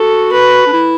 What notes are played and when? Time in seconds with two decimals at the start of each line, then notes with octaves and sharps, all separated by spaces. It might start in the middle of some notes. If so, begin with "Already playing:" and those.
Already playing: F#4 A4
0.33 B4
0.67 D4
0.73 E4